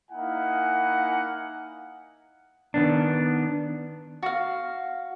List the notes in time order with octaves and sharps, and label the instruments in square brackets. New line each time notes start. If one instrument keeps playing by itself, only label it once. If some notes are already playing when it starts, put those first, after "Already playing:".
[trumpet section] A#3 D#4 E4 F5 F#5 G#5
[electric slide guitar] D#3 B3 D4
[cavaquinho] F#4 F5